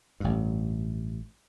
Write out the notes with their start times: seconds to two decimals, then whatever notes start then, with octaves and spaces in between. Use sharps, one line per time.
0.20 A1 G2